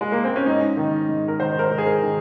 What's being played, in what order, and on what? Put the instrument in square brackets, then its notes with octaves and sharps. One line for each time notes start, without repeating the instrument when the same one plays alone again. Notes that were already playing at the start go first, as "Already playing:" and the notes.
[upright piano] G#3
A#3
C4
C#4
G#2 D#4
D#3
G#2
A#4
D#3 C5
A#4
C5
G#2
G#4
A#4
D#3